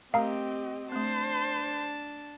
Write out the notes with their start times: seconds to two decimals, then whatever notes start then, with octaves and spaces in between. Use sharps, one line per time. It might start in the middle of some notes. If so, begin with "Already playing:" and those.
0.14 A3 C4 G4 A#4 D#5 F5 A#5
0.92 A3 C4 D4 C5 A5